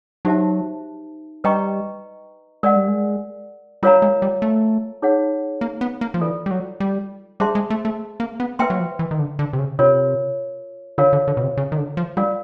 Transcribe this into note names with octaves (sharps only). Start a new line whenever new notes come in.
F#3 D#4 G4 C5 E5 A5
G3 B4 D#5 G5 A#5 C#6
G#3 A#4 D5 F#5
G3
G#3
G3 F4 A#4 C#5 F5 A#5
G#3
G3
A3
D#4 G#4 C#5 F#5
A#3
B3
A#3
F3
E3 F4 A4 D5
G3
F#3
G3
G3 G#4 C5 E5 A5 C6
G#3
A3
A3
A#3
B3
A#3 B4 E5 G5 C6
F#3
F3
E3
D#3
D3
D3
C3
C#3
C3 F4 A#4 C#5
D3 F4 A#4 C#5 F5
D3
D3
B2
C3
C#3
D#3
D3
F3
G3 F4 A#4 D5 F5